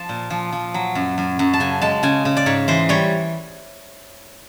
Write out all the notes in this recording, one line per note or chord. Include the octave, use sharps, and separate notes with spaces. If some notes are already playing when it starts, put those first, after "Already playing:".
Already playing: F3 A5
A#2
F3
F3
F#3
F#2
F#2
F#2
A5
C#3 G#5
G#3 A5
C#3 G#5
C#3
D5
G#2 C#5
E3 C5
G3 C#5